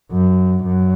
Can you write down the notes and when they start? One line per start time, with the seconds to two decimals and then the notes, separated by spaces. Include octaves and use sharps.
0.12 F#2
0.65 F#2